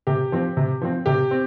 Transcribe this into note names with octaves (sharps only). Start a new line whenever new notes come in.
C3 G4
F3 C4
C3
F3 C4
C3 G4
C4